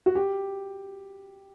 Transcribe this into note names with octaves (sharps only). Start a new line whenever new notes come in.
F#4
G4